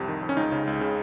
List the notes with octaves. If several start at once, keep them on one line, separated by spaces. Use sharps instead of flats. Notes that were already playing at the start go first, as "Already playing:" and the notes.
Already playing: C2 F2 C3
D#3
F2
C#4
C#2 D#4
C#3
C#2
C#3